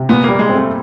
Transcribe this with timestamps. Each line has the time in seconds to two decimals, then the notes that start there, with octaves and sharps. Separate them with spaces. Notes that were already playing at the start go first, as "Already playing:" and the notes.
Already playing: C3
0.09 A#2 B3
0.24 G3 A#3
0.39 G#3
0.49 C4
0.54 A3